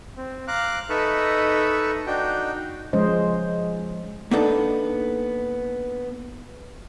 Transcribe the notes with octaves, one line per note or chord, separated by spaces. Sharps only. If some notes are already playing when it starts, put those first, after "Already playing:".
C4
F5 A#5 D6 F#6
D#4 A4 B4 D#5 E5 C#6
D4 D#4 F#4 G5
F3 G#3 C#4 C5 D#5
A#3 B3 D4 D#4 A4